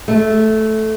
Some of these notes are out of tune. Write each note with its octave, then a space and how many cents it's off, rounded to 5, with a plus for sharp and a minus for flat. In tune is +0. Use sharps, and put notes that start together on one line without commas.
A3 -10